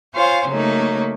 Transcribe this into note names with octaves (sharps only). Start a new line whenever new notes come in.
F4 C5 C#5 F5 G#5
C#3 F#3 A3 A#3 D#4